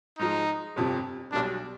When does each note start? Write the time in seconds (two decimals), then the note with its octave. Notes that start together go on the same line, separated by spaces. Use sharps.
0.19 G#2 F3 G#3 D#4
0.76 G1 F2 C3 F3
1.32 B1 B2 G3 D4